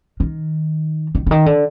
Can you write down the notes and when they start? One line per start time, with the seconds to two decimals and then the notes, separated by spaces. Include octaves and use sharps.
0.20 D#3
1.15 D#3
1.26 D3
1.31 D#3
1.46 D3